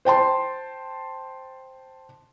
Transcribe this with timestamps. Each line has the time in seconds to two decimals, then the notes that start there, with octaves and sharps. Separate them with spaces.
0.05 C5 G5 A5 C6